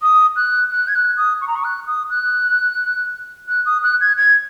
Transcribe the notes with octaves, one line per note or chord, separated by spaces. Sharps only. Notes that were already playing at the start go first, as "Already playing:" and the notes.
D#6
F#6
F#6
G#6
F#6
D#6
C#6
A#5
C#6
F#6
D#6
F#6
F#6
D#6
F#6
G#6
G#6